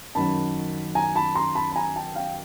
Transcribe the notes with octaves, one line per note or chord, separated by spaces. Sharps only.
F#2 D#3 F#3 A5 B5
G#5 A#5
A5 B5
A#5 C6
A5 B5
B5
G#5 A#5
G5 A5
F5 G5